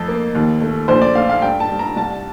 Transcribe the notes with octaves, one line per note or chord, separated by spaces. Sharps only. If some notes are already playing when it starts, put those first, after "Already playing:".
Already playing: F2 A3 A4
A#3
D#2
A3
A#1 C5
D5
A3 F5
F5
G2 G5
A5
G3
A#5
C2 A5